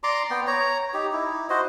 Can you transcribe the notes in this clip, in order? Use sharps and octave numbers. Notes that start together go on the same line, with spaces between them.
D5 A#5 C6 D6
B3 G5
C#5 A#5
D#4 G4
D#4 E4
F#4 C5 D#5